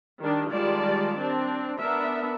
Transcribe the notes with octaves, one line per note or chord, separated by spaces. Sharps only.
D#3 G3 D4
D#3 G3 G#3 F4 D5 A5
C4 D4
B3 D4 A#4 E5